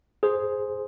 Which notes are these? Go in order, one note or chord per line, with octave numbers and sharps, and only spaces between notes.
G#4 C5